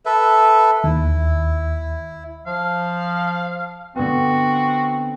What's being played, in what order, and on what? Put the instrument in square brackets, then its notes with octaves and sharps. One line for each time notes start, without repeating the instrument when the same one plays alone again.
[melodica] A4 B4 E5
[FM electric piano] D#2 [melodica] E4
[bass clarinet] F3 [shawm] F5
[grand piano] D3 B3 [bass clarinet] C4 [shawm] F#4